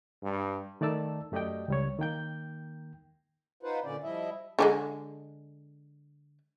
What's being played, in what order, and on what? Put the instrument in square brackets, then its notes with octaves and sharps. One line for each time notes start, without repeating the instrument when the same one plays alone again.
[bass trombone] G2
[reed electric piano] D#3 A3 D5 A5 E6
F#2 A3 G4 D5 D#5 G5
C#2 G3 C#5
D#3 A#3 G5 G6
[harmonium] D#4 F4 B4 C5 F#5
A#2 D3 C#4 D5
F3 G3 E4 D#5 E5
[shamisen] D3 F3 G#3